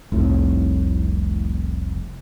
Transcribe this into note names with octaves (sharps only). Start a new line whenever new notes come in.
F1 C2 A2